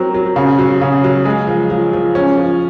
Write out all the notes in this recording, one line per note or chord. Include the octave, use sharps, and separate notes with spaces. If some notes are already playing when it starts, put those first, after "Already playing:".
Already playing: F#3 C4 A#4
F#3
C#3
F#3
C#3
F#3
G#3
F3
F3
F3
C#4
F3